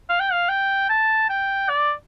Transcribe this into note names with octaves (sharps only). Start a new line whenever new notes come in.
F5
G5
F5
G5
A5
G5
D5